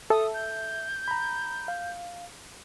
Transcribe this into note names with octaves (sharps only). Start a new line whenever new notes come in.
A4 E5 D#6
G6
A#5 B5
F5